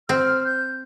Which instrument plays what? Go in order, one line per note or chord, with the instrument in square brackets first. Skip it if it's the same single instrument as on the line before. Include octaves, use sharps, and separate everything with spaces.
[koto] C4 [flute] F6
[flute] G6